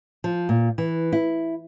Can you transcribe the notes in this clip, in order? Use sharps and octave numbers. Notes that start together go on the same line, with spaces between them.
F3
A#2
E3
E4